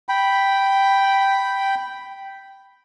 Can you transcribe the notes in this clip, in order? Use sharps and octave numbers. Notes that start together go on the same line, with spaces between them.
G5 B5